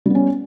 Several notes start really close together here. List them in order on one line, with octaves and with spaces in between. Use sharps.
G3 B3 C#4